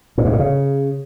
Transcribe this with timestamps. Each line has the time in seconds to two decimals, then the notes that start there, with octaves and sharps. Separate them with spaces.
0.18 A2
0.25 G2
0.32 A2
0.39 C#3